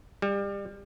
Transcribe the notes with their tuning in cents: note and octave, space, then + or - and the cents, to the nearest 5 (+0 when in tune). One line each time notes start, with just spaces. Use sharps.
G3 +30